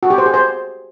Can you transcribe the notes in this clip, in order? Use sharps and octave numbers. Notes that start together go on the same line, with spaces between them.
F#4
G4
C5
G#4
C5